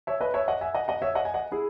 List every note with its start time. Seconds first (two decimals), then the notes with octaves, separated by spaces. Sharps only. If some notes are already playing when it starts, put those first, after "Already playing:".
0.07 C#5 E5
0.21 B4 D#5
0.34 C#5 E5
0.48 D#5 F#5
0.61 E5 G#5
0.74 D#5 F#5
0.88 D#5 F#5
1.02 C#5 E5
1.15 D#5 F#5
1.25 G#5
1.34 D#5 F#5
1.52 E4 G#4